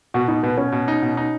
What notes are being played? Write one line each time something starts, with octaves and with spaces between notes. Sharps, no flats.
B2 F#4
B2 D#4
B2 B3
B2 C#4
B2
D#4
B2
D#4